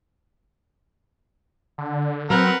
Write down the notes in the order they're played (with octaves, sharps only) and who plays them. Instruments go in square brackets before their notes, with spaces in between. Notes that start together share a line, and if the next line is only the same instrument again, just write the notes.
[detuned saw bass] D3
[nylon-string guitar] F#3 [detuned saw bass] C4 [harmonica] A#4 B4 F#5